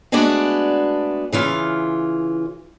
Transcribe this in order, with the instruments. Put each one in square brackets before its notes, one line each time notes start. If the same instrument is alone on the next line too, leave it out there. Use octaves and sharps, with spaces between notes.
[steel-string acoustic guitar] G#3 A3 B3 D4 F#4 D5
C#3 E3 F4